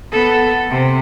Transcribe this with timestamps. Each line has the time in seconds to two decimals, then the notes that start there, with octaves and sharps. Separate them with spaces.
0.12 B3 A4
0.70 C3